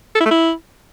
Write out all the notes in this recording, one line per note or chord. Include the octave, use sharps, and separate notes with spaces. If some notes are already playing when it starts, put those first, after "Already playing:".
A4
E4
A3
E4